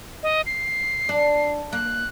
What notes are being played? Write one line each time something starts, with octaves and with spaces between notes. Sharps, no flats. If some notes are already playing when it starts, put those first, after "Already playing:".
D#5
C7
D4
A#3 F#6